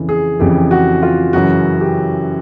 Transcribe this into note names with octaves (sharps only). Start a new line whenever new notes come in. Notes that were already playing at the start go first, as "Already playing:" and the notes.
Already playing: F2 C#3 E3
G#4
F2 C#3 E3 G4
F#4
F4
F#2 C#3 E3 F#4
G4